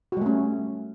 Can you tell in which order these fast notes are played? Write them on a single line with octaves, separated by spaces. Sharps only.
F#4 G3 A3 C#4